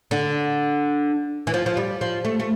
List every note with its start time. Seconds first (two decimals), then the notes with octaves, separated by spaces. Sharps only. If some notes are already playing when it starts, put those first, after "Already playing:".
0.11 D3
1.47 E3
1.54 F3
1.66 F3
1.77 G3
2.01 F3
2.25 A3
2.40 A3